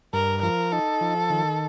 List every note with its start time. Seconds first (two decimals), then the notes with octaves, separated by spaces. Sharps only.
0.13 G2 A#4
0.42 F3 A#4
0.72 D#4 A4
1.01 F3
1.30 D#3